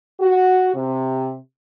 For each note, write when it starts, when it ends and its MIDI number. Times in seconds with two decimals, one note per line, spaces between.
0.20 0.70 66
0.74 1.36 48